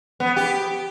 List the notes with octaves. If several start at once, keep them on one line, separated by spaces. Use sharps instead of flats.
B3
G4